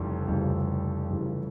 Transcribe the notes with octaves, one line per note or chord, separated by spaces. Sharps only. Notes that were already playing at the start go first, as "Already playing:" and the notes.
Already playing: F1 F2 C#3 E3 G3
F1 F2 C#3 E3 G3
F1 F2 C#3 E3 G3